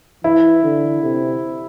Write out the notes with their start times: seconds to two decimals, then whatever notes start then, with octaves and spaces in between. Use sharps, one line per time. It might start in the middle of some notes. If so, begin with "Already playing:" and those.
0.24 E3 E4
0.63 D3
1.03 C3